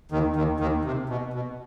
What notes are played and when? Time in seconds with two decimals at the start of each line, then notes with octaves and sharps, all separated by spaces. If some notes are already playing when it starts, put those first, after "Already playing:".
0.11 D#2 D#3
0.36 D#2 D#3
0.60 D#2 D#3
0.85 C3
1.09 B2
1.33 B2